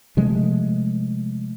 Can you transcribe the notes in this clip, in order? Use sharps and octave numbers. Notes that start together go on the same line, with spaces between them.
C3 F3 G#3 A3